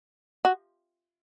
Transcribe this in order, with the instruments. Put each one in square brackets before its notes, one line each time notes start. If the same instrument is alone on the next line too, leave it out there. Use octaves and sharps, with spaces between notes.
[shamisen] F#4